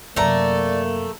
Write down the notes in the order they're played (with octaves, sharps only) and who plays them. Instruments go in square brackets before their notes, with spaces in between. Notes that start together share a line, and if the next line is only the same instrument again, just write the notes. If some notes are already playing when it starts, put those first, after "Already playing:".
[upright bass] F#2 C3 [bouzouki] A3 A#5 [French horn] A#3 [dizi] D5